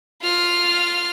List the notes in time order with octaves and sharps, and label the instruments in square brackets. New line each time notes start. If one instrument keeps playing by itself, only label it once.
[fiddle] F4 F6